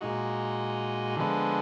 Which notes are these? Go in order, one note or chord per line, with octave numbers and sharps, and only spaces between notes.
A#2 G#3 D#4 F#4
D3 F3 G#3 B3